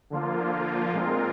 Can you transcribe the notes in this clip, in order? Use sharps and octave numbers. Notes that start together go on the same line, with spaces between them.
D3 F3 A#3 F4
A#2 G#3 C4 F4 A#4